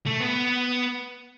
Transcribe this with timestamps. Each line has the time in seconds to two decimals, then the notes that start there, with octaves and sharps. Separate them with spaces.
0.06 A3
0.20 B3